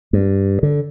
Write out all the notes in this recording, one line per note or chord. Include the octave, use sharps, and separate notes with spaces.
G2
D3